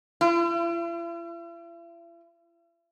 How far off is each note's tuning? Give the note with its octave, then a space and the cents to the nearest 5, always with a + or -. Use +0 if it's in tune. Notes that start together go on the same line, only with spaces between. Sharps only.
E4 +45